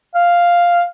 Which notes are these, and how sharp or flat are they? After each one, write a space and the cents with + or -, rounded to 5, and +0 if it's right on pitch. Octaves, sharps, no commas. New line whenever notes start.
F5 +0